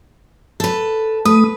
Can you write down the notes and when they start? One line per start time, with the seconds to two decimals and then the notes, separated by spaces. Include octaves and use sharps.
0.60 A4 B4
1.25 A3 B4 D#6